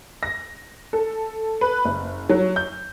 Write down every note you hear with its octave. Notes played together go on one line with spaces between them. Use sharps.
A#6
A4
B4
F#1
F#3
G6